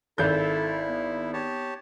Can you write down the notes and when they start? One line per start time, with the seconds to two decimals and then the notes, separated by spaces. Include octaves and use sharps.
0.18 G#1 E4 A4 G6
0.89 B3
1.33 G4 C#5 A5